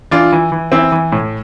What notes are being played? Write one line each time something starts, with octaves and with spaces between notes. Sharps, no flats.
E3 D4 F4
E3
E3
E3 C4 E4
E3
A2